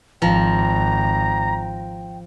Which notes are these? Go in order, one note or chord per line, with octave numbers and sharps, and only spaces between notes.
G#1 F3 G5 A#5